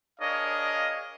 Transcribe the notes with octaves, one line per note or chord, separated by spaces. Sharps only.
D4 G#4 A#4 C#5 D#5 F5